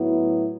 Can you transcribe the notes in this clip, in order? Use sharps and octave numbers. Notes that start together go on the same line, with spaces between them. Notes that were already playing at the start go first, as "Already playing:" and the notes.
Already playing: A2 F#3 B3 E4